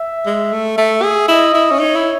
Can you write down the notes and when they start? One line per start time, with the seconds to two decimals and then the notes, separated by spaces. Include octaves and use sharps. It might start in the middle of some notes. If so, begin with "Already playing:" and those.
Already playing: E5
0.26 G#3
0.53 A3
0.78 A3 E5
1.03 G#4
1.28 E4 D#5
1.54 E4
1.71 C#4
1.79 D#4 C#5
1.96 E4